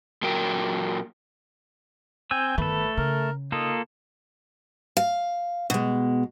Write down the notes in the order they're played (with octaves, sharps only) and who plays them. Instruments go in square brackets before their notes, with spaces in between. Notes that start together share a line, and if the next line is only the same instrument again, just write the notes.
[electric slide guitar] A#2 F#3 A#4 G5
[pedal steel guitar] C4 G#5 E6 [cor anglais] G5
[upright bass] G1 D#3 [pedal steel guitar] A3 A4 [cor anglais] B4
[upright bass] C#3 [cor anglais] A#4
[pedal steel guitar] A#3 F4 A4 [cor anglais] D#4
[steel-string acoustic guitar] F5
B2 G#3